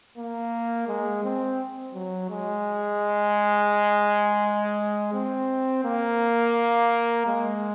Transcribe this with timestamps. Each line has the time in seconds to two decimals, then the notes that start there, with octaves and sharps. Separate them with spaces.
0.17 A#3
0.88 G#3
1.24 C4
1.94 F#3
2.30 G#3
5.14 C4
5.84 A#3
7.27 G#3